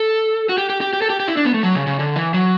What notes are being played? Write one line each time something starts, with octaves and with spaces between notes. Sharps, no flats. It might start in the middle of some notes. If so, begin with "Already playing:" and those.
Already playing: A4
F#4
G4
G4
G4
G4
A4
G4
G4
E4
D4
B3
A3
F#3
C#3
C#3
D3
E3
F#3